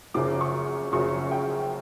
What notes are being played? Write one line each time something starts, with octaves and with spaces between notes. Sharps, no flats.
F#1 F#2 C#3 F3 D6
C#6
F#1 F#2 C#3 F3 C#6
G5